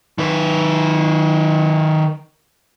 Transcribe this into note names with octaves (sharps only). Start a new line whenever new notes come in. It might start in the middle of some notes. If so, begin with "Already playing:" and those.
D#3 B4